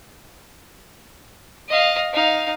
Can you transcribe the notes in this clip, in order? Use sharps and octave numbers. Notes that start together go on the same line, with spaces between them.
D#5 F5
D#4 F5